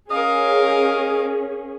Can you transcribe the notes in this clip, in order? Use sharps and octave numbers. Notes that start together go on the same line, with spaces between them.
C#4 G#4 A#4 D#5 F5